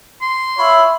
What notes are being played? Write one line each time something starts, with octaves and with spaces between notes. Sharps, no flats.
C6
F4 C#5 E5 B5